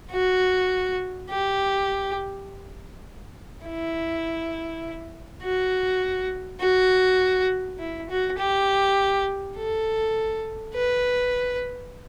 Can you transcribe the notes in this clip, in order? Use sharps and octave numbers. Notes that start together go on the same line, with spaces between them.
F#4
G4
E4
F#4
F#4
E4
F#4
G4
A4
B4